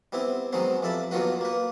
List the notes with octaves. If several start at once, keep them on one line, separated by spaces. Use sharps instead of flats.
G3 B3 C4 E4
D#3 F#3 G#3 B3 C4 C5
F2 G3 E5 A5 B5
D#2 F#3 B3 F4 F#4 B4
A#3 B4